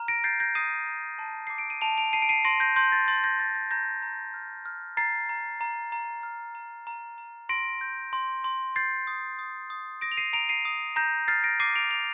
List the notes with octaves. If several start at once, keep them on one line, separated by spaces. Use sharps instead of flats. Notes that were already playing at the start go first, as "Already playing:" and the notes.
Already playing: A#5 F6
A#6 D7
G6 A6 C7
G6 A#6
D#6 C7 D#7
A#5
A5
D6 C7
D7
D#7
A5 D7 F7
D7 F7
A5 C7 D#7
D7
C7 D#7
C6 A#6 D7
G6 A#6
C6 G6
A6
C6 A6
G6 A#6
C6 A6
A6
A#5 G6 A#6
A#5
F6
F6
A#5 A6 C7
A#5
A#5
A#5
F6
A#5
A#5
A#5
C6 A#6 D7
G6
C6
C6
G6 A6 C7
D#6
D#6
D#6
D#6 A#6 D7
F7
C7 D#7
A#5 D7 F7
C7 D#7
D#6
A#5 G6 A#6
F6 A6 C7
A#6 D7
D6 C7 D#7
D7 F7
F6 D7 F7